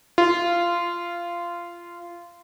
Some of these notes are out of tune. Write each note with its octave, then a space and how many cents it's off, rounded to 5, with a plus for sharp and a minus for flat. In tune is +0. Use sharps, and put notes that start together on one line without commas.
F4 -15